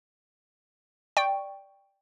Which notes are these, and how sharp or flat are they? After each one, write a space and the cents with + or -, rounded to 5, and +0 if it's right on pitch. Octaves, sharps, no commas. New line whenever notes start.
D5 +0 G5 +5 C#6 +0